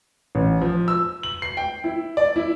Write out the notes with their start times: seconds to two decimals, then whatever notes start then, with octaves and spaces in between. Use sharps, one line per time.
0.35 A1
0.62 F3
0.88 E6
1.23 F#7
1.42 C7
1.57 G5
1.84 E4
2.17 D5
2.36 E4